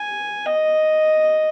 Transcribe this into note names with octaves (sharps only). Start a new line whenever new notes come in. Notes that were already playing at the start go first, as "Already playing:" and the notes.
Already playing: G#5
D#5